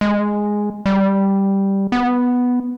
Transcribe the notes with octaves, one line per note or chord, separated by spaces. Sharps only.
G#3
G3
B3